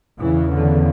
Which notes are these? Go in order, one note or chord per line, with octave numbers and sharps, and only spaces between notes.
E2 C#3 E3
D3